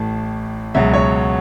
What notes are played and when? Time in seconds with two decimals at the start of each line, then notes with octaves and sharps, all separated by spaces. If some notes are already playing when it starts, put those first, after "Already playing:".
Already playing: A1 A2 A3 A5
0.75 C#2 B2 F#3 E5
0.93 C#5